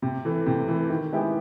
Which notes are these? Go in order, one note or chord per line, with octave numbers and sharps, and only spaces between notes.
C3
E3 A3
C3
E3 A3
D#3
G#3 B3 E4 G4